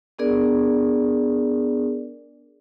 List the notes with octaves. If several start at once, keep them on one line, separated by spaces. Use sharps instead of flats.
B3 D4 G#4 A#4 D5